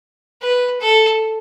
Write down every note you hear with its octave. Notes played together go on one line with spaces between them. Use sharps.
B4
A4